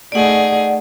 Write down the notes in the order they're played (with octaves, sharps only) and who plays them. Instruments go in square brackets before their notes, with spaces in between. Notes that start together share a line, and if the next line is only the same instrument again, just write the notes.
[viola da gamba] A3 D#4 G#4 [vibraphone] D5 F#5